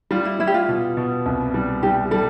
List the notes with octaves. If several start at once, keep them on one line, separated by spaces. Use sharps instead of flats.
G3 F4
E4
G3 E4
G4
F4
B2
B2
C2
G3
G3 G4
G3 A4